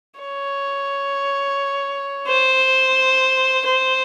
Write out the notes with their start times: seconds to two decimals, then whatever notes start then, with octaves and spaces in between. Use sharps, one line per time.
0.20 C#5
2.28 C5
3.65 C5